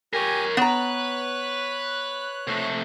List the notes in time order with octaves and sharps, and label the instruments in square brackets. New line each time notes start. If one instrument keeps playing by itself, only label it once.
[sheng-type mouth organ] G4 G#5 [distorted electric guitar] A#4 C#5
[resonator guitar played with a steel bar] B3 A#5 [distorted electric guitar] B4 [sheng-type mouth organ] C#5 F#6
[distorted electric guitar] C3 A3